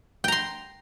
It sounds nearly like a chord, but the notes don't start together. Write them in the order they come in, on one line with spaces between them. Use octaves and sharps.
G5 A#5 C6